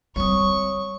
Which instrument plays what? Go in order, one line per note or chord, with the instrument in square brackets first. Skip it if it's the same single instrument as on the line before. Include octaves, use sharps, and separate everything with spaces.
[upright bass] G3 C4 [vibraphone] C#5 D#6 [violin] C#6